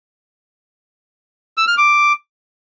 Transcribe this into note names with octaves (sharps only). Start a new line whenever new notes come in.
E6
F6
D6